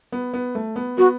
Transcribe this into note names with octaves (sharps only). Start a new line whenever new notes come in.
B3
B3
A3
B3
B3 F#4